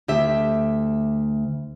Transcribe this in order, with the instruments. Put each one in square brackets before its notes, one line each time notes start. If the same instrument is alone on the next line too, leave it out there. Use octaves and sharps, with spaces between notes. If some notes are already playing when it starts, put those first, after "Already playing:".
[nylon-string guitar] D2 G4 E5